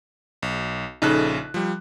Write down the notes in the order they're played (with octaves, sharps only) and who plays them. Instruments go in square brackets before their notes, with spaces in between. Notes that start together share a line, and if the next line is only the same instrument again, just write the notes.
[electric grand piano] B1
[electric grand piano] A#1 C#3 F#6 [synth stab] D#4 A4
[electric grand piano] F3 G3